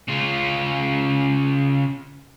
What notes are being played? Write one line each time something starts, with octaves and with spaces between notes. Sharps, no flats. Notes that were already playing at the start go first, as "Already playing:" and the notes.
C#3 F4